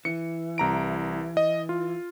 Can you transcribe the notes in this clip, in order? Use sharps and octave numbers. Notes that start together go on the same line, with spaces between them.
E3 C#7
C2 A#5 D7
D#5
F4